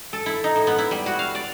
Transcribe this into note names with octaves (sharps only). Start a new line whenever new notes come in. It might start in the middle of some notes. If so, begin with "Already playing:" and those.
A4
E4
D#4
A2
B3
E4
G3
F#4
F5
D5